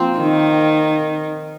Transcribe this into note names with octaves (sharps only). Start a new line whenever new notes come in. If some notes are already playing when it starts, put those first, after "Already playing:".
Already playing: F3 A#3 C4
D#3